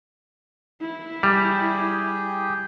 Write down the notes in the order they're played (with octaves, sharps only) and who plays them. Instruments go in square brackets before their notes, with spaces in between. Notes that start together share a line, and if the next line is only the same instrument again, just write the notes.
[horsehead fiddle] E4
[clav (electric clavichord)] G3 [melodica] G4 G#4 G5